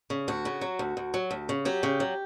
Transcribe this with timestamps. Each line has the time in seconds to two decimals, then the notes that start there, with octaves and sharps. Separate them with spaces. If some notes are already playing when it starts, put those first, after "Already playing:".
0.10 C#3
0.28 D2 F#4
0.45 C#3
0.61 F#3
0.79 D2
0.97 D2
1.14 F#3
1.31 D2
1.49 C#3
1.65 F#3 G4
1.83 C#3
2.00 F#3